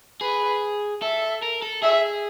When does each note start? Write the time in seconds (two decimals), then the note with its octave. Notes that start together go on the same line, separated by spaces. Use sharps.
0.21 G#4 B4
1.02 A4 E5
1.42 A#4
1.62 A4
1.82 G#4 E5